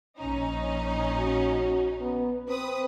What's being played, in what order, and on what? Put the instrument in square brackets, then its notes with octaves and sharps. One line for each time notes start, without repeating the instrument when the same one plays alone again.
[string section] A#1 C#4 D#4
[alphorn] F#4
B3
[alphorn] C4 [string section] B4 D#6